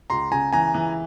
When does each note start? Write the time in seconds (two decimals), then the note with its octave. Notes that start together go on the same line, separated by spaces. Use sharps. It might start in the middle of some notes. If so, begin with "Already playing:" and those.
0.10 C#2 A#5 C6
0.32 C#3 G#5 A#5
0.53 E3 G#5 A#5
0.74 E3